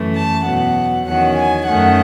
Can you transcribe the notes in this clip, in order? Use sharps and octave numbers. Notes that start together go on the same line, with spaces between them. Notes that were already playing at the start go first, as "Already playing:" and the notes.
Already playing: F#2 E3 A3
A5
E2 B2 F#3 B3 F#5
E2 D#3 F#3 C#4 F#5
G#5
F#2 D#3 A3 F#5